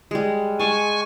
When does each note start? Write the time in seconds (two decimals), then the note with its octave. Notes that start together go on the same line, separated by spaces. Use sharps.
0.11 G3 G#3
0.59 G#3 G#5 A5 C#6